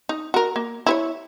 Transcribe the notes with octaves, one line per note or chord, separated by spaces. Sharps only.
D#4
F#4 A#4
A#3
E4 B4 C#5